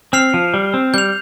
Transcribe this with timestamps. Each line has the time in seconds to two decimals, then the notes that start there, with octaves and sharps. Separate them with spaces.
0.13 C4 F6 C7 F7
0.34 F3
0.54 G3
0.74 C4
0.94 G3 G6 F7